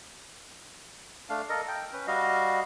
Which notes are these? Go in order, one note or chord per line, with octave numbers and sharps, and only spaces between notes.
A3 D4 F5
A4 A#4 D#5
G5
C#4 B4
G3 F#4 D#5 F5